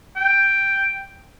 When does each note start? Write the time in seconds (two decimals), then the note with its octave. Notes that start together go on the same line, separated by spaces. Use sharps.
0.16 G5